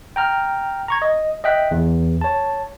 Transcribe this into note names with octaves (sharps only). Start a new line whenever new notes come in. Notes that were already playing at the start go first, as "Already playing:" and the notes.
G5 A#5 F6
A#5 C#6 G#6
D#5
D#5 E5 G5 F#6 B6
E2
C#5 A5